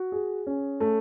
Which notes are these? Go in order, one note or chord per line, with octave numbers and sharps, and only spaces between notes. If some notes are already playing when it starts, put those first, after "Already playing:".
Already playing: F#4
G#4
C#4
A3